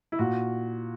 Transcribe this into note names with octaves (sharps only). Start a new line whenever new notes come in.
E4
A#2 F#4